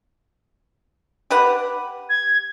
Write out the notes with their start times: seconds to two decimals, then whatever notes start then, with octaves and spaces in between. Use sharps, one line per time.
1.30 G4 B4 F#5
2.09 G#6